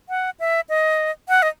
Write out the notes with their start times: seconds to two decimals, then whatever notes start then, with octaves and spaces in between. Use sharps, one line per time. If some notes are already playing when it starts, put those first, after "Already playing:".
0.09 F#5
0.40 E5
0.69 D#5
1.29 F#5
1.42 D#5